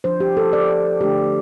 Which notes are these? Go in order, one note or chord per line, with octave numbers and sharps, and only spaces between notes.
F3 D4 C5
G4
A4
D5
D3 A3 D4 G4